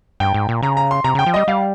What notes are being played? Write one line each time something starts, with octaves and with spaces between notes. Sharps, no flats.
G2 G5
G#2
A#2
C#3 A#5
A#5
C6
C3 A#5
C#3 G5
F3
G3 D#5
G3 F5